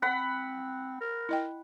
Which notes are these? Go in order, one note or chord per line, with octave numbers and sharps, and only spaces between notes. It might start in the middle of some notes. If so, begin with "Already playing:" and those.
C4 F#5 B5
A#4
E4 D#5 G5